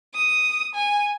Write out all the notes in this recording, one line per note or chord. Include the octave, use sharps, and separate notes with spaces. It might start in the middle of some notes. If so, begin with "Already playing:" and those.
D#6
G#5